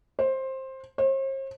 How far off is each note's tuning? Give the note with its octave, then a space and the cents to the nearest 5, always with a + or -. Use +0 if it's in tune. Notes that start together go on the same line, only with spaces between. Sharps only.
C5 +15
C5 +45